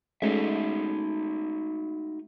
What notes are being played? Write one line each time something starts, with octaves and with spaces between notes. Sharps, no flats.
G#3 A3 C#4 D#4 F#4 E5